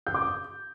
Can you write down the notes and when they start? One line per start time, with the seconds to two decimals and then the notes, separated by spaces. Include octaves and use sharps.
0.07 G6
0.14 D6
0.22 D#6